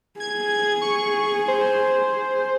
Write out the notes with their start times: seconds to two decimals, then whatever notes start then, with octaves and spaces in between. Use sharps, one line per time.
0.20 G#4 G#6
0.81 C#6
1.48 C5